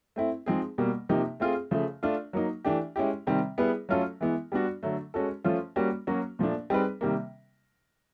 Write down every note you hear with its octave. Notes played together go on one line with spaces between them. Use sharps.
A3 C4 E4
F3 G#3 C4 D#4 G#4
B2 G3 A#3
C3 F3 A#3 D#4 G4
A3 C4 F4 G#4
C#3 F3 A3
A3 D4 F4
F#3 A#3 D#4
E3 A3 D4 G4
G#3 C#4 E4 G4
C3 D#3 G3 C4
G3 B3 E4 G#4 B4
F#3 A3 C#4 F4 A4
E3 G#3 B3 E4
G3 B3 D4 F#4
D3 F#3 A3
G#3 C#4 F#4 A4
F3 A3 C#4 F4
G3 A#3 C#4 F#4
F#3 A#3 C#4 F#4
A#2 F3 A3 D4
G3 C4 D#4 G#4 B4
C3 D#3 G3 A#3